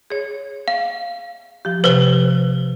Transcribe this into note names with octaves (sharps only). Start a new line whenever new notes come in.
G#4 C#5
F5
F3 G4
C3 F3 B4 C5